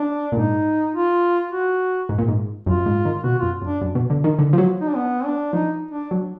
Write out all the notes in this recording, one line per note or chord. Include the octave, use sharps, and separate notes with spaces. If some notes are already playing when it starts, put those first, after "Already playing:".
Already playing: D4
A#2
G#2 D#4
F4
F#4
G#2
A#2
G#2
F#2 F4
G#2
D#3
B2 F#4
F#2 F4
F#2
D4
F#2
B2
D3
D#3
D3
F3
F#3
D#4
D4
B3
D4
F3 D#4
D4
F#3